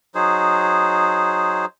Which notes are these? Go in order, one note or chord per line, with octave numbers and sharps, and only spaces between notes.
F#3 D#4 G#4 C5